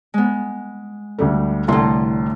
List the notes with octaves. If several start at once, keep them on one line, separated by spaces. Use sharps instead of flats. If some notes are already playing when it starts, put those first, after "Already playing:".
G#3 B3
D2 G3 A3
C2 A2 D3 C6